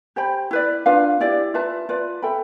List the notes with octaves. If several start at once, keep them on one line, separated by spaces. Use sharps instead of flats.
G4 C5 G5 B5
E4 B4 D5
D4 F4 B4 F5
E4 G4 D5
F4 B4 E5 A5
F4 B4 D5
A4 E5 G5 B5